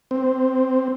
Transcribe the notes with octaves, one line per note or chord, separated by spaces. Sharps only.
C4